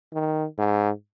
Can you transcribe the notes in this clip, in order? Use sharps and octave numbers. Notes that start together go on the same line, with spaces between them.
D#3
G#2